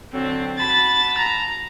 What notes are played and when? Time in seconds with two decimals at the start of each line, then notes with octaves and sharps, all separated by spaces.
0.13 D3 F#3 C4
0.59 F#4 A5 B5 A6
1.18 A#5